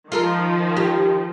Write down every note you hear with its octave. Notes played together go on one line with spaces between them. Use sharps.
D#3 F3 F4 A4 A#4
G4